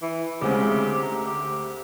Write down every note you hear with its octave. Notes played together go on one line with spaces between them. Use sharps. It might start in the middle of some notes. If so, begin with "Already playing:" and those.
E3
D2 C#3 G#3 C4 G4
A#5
G4